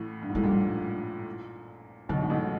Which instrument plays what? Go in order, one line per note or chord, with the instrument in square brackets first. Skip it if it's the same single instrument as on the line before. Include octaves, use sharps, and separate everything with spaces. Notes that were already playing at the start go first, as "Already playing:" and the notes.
Already playing: [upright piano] A1 A2
G2
G#2
[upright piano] A2 [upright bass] G#3
[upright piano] A#1 A#2 [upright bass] G3
[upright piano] B1 B2 [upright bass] D3
[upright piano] G#2
A1 A2